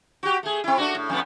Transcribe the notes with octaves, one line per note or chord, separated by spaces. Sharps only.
F#4 G4
A3 G#4
C4 E4
A3 D4 F#4
A2
F2 A2 B3